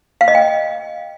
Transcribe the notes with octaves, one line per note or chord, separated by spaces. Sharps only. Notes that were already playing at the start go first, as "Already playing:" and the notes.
F5
D#5
G5